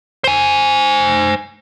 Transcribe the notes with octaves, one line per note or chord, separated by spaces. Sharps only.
C5 G#5